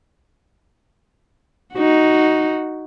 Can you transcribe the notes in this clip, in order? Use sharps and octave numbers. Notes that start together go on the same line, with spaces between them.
D#4 F#4